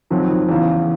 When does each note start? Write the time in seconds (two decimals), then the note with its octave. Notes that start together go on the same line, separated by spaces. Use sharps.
0.10 F2 C3 D#3 F#3
0.49 E2 C#3 E3